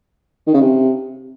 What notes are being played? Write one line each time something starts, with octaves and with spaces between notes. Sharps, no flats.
D#3
C#3
C3